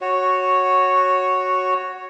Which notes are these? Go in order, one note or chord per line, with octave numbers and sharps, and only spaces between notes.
F#4 C#5